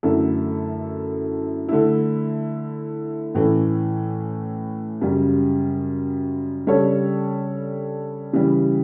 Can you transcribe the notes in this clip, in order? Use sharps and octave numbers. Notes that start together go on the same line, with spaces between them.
F#2 D3 A3 E4 A4
D3 A3 E4
A2 E3 A3 C#4
F#2 C#3 G3
C#3 G3 D4 A4 C#5
C#3 E3 G3